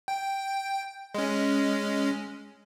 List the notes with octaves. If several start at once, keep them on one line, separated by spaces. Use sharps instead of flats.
G5
G#3 C#4